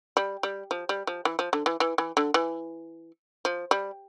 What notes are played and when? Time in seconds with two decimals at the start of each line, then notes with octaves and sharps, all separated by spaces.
0.17 G3
0.43 G3
0.71 F3
0.89 G3
1.07 F3
1.25 E3
1.39 F3
1.53 D3
1.66 E3
1.80 E3
1.98 E3
2.17 D3
2.34 E3
3.45 F3
3.71 G3